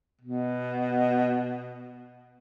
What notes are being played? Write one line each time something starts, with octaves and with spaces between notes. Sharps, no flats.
B2